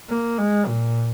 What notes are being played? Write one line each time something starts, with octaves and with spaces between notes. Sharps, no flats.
A#3
G#3
A#2